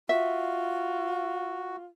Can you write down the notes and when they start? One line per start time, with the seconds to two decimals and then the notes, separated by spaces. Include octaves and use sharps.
0.09 F4 F#4 E5